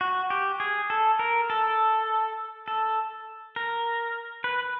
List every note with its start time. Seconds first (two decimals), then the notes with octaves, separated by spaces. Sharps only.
0.01 F#4
0.30 G4
0.60 G#4
0.90 A4
1.19 A#4
1.50 A4
2.68 A4
3.56 A#4
4.44 B4